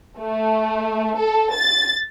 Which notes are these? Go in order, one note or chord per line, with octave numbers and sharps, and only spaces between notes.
A3
A4
A6